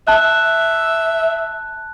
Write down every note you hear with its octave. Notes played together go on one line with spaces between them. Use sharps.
E5 A5 F#6